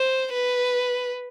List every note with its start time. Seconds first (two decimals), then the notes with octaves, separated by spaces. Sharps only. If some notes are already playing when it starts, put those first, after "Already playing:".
Already playing: C5
0.33 B4